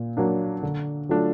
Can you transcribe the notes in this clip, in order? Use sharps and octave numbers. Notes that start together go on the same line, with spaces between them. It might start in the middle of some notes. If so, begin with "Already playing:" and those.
Already playing: A#2
F#3 A#3 D4
D3
F#3 A3 D4 F4